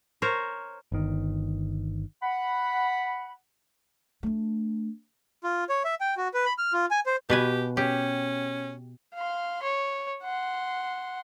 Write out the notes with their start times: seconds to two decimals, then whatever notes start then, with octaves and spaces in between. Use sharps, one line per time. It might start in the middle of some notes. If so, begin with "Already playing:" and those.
0.22 A#4 C5 C#5
0.92 G1 D#3
2.23 F#5 B5
4.23 A3 D4
5.44 F4
5.69 C#5
5.85 E5
6.01 G5
6.17 F#4
6.34 B4
6.45 B5
6.58 F6
6.73 F4
6.91 G#5
7.06 C5
7.30 B2 G4 B4 G#5
7.77 C#4 G4
9.14 F5 C6
9.63 C#5
10.23 F#5 C6